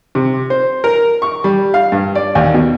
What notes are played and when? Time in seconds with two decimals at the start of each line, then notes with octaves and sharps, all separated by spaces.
0.15 C3
0.50 C5
0.84 A#4
1.22 C#6
1.44 G3
1.74 F5
1.92 G2
2.15 D5
2.35 D#2
2.54 B2